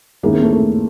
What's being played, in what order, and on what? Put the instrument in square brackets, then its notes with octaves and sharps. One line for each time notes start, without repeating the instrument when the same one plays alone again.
[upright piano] D#2 D#3 G#3 C#4 E4 [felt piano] A#3
[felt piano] C4
A3
A3